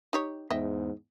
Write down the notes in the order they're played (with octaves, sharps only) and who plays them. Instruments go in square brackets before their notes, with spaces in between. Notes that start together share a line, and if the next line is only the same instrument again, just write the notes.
[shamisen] D#4 G4 C#5
[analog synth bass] E2 [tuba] G#2 [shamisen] D#5 E5 G5